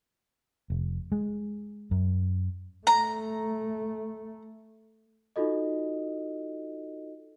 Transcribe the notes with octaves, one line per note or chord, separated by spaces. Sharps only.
F1
G#3
F#2
A3 A#5
D#4 F4 F#4 A4 D#5